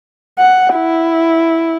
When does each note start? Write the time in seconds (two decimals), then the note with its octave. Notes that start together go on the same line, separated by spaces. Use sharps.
0.39 F#5
0.75 E4